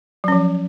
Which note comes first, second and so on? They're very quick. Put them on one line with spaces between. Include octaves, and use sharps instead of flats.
F#3 C#4 F3